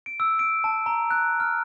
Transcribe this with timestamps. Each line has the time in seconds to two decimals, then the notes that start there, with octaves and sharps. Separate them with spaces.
0.06 D7
0.20 E6
0.39 D7
0.64 A5
0.86 A#5
1.11 F#6
1.40 F6